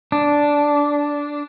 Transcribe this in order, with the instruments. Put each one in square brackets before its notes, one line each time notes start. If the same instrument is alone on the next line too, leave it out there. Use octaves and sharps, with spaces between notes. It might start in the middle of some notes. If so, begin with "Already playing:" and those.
[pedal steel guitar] D4